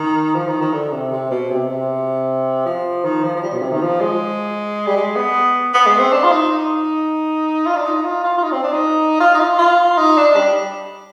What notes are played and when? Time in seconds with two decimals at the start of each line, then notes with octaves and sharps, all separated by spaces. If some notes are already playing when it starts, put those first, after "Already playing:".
Already playing: D#3
0.35 F3
0.48 D#3
0.61 D#3
0.73 D3
0.92 C3
1.12 C3
1.31 B2
1.51 C3
1.70 C3
2.66 F3
3.04 D#3
3.23 F3
3.35 F3
3.43 G3
3.53 B2
3.62 C3
3.72 D#3
3.82 F3
4.00 G#3
4.87 G3
4.97 G#3
5.16 B3
5.74 B3
5.86 G#3
5.99 C4
6.12 D4
6.23 F4
6.31 D#4
6.51 D#4
7.66 F4
7.76 D4
7.86 D#4
8.04 F4
8.23 F4
8.38 F4
8.43 D#4
8.52 C4
8.63 D4
8.72 D#4
9.20 F4
9.34 D#4
9.40 F4
9.58 F4
9.98 D#4
10.17 D4
10.36 G3